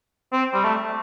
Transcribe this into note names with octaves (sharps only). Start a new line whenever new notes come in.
C4
G3
A3